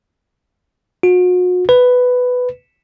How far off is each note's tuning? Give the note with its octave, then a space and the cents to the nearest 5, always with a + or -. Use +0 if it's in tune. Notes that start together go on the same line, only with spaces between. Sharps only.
F#4 -40
B4 +10